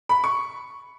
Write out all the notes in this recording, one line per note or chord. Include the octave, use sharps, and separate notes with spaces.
B5
C#6